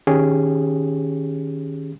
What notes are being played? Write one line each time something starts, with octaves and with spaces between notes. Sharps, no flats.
D#3 C#4 G4 G#4